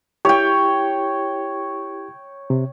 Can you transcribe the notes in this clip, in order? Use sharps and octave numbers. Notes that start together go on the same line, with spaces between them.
E4 G4 C#5 G5
C3